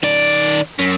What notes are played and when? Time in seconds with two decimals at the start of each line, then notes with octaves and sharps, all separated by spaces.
0.03 D#3 D5
0.79 F#2